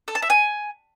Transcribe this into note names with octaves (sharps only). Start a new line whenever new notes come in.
A4
A5
E5
G#5